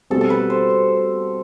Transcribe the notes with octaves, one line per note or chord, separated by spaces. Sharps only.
B2 G3 C4 F#4 A4
A4
B4
C5